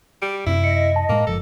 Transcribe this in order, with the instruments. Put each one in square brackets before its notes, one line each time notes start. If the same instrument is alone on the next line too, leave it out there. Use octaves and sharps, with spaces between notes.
[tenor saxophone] G3 [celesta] D7
[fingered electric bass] F#2 C3 C4 [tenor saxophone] E4
[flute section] D#5 [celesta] C#7
[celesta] A5
[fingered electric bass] A2 G#3 [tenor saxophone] A#3
[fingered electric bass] F#1 F3 [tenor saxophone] A4